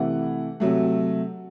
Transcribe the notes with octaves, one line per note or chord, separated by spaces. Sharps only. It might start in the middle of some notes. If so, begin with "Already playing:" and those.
Already playing: C3 E3 A3 F#5
C3 F#3 A3